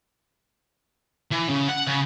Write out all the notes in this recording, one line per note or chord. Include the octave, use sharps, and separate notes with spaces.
E3
C#3
F#5
C#3